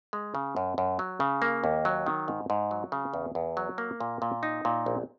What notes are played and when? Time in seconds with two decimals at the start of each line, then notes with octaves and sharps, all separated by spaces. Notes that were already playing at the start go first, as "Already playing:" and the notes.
0.13 G#3
0.35 C#3
0.56 F#2
0.78 F#2
0.99 F#3
1.20 C#3
1.42 A#3
1.64 D#2
1.85 F#3
2.06 D#3
2.28 G#2
2.50 G#2
2.71 F#3
2.92 C#3
3.14 E2
3.35 E2
3.57 F#3
3.78 A#3
4.00 A#2
4.22 A#2
4.43 D#4
4.65 A#2
4.86 A#1